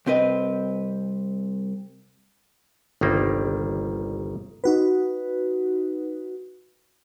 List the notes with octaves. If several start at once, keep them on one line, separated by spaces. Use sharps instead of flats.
C2 C4 B4 D#5
G1 C2 D#3 G3 A#3
D#4 F#4 B4